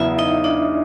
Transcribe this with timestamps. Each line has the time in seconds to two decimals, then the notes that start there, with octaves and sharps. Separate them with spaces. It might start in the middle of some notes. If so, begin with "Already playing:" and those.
Already playing: E2 C#3 F#3 B3 E4 E5
0.19 D#4 D#5
0.44 D4 D5